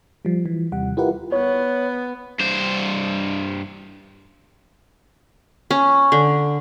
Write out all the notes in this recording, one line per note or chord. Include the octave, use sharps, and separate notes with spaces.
F3 G3
E3
D#2 C3 G3 F#5
E4 F4 G4 A#4 B4 F#5
B3 C#5
G2 C5
C#4
D3